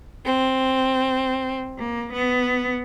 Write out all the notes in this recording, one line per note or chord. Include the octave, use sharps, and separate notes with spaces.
C4
A#3
B3